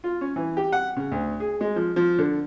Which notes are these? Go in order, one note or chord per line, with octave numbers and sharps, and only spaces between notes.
F4
C#4
E3
G4
F#5
C#3
D2
G#4
G#3
F3
F3
D3